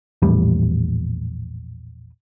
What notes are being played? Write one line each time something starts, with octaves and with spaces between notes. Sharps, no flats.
A#1 E2 A2 G3